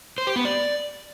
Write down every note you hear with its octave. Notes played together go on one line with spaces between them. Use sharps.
C5
G4
B3
D5